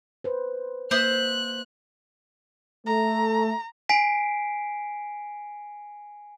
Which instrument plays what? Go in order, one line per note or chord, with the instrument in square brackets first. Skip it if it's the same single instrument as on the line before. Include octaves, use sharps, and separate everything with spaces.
[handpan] B4 C5
[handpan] A#3 [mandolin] C5 E5 D#6 [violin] F#6
[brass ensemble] A3 [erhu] A#5
[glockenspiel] G#5 B6 C7 D7